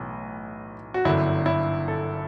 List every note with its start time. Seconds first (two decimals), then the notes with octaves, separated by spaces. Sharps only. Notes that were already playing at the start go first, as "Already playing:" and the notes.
Already playing: B1 A2 E3
0.94 F#4
1.05 G1 F#2 D3 E4
1.46 E4
1.88 A4